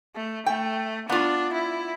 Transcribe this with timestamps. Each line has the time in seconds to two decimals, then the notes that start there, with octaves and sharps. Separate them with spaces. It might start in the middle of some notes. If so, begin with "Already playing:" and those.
0.16 A3
0.46 A3 G5
1.09 B3 D4 F4
1.54 E4